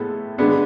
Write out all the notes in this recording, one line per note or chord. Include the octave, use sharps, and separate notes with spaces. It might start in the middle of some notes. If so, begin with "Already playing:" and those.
Already playing: A2 G#3 B3 E4 A4
D3 G#3 B3 D4